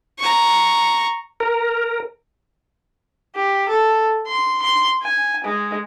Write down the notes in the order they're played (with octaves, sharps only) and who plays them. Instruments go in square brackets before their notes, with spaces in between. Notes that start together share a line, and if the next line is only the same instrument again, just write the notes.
[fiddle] A#5 C#6
[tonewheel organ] A#4
[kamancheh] G4
A4
C6
C6
G#5
G#3